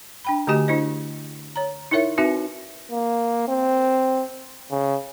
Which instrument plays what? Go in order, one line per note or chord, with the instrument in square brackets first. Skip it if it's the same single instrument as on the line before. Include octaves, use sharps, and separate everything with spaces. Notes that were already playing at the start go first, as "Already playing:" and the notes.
[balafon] D4 G5 B5
D3 A3 F#4 G4 D#5 G#5
D4 E4 C5 D#5
C#5 A#5
D#4 E4 A#4 C#5 E5
C4 D#4 F#4 B4 E5 G#5
[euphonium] A#3
C4
C#3